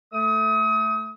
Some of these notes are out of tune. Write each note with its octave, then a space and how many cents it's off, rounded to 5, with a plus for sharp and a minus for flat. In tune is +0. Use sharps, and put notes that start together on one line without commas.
A3 +0 D#6 +35